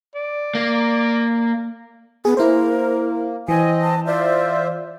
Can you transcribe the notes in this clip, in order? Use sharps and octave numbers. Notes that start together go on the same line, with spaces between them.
D5
A#3
B3 G#4
A#3 E4 A#4 C5
E3 C4 D#5 G#5
A5
F4 C5 D5 E5